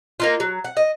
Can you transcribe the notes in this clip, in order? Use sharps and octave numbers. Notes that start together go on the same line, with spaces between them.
A#3 D#4 F4
F#3
F#5
D#5